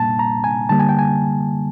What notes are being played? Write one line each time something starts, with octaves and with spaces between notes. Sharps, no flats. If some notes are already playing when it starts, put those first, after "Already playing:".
Already playing: A#2 G3 A#3 A5
A#5
G#5
D3 G3 A#3 A5
G#5
G5
G#5